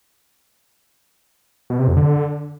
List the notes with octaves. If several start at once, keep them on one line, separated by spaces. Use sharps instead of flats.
B2
C3
F2
D3